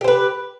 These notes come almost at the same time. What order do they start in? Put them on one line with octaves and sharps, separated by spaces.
G4 C5 B4